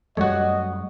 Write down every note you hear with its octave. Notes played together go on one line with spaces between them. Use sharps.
F#2 G3 A3 F#4 C#5 D#5